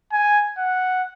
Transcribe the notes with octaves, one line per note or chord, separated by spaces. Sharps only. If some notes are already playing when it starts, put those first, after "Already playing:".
G#5
F#5